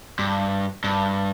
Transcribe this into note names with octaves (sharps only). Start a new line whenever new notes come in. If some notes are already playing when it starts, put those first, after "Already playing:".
G2
G2